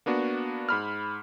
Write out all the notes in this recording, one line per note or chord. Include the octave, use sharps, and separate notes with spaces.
A#3 B3 D4 F#4
G#2 B5 F6